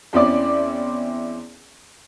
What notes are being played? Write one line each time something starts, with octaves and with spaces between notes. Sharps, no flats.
E2 C4 C#4 E4 D5 D6